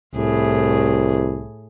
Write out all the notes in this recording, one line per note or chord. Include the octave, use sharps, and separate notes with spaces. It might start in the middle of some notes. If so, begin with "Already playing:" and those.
C2 A2 G#4